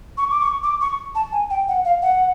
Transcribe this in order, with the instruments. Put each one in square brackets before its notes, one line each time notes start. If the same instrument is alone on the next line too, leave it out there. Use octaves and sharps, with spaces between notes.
[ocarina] C#6
D6
C#6
D6
C#6
A5
G#5
G5
F#5
F5
F#5